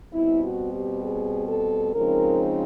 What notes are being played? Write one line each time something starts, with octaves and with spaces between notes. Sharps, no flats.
B2 G3 C4 E4
F#4
G4
G#4
A4
C#3 F3 G#3 C4 D#4 A#4